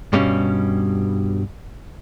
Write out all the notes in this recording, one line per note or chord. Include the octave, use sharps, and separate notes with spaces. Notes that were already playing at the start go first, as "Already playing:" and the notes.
G2 B2 G3 C#4